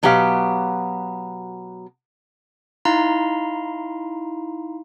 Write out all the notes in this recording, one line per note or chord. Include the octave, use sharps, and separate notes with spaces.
B2 F#3 B3 G4 C#5 F5
D#4 E4 F5 A#5 C6